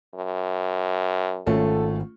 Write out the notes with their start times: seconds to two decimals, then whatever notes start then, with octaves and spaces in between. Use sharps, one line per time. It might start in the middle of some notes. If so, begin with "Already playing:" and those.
0.15 F#2
1.47 G#1 A3 C#4 F4 A4